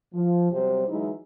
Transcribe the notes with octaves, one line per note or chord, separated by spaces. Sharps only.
F3
C3 F#3 G3 C4 G4 C5
E3 F#3 G#3 D#4 E4